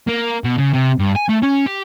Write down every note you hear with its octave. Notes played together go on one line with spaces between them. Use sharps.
A#3
B2
C#3
C3
G2
G#5
A3
C#4
G4